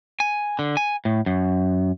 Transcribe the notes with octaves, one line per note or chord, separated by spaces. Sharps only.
G#5
D3
G#5
A2
F#2